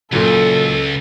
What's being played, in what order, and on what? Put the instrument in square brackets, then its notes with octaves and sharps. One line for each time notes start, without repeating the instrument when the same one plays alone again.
[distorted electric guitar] C#2 [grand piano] A#2 F#3 [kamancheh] A4